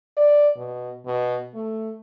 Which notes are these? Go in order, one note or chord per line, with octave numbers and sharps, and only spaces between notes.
D5
B2
B2
A3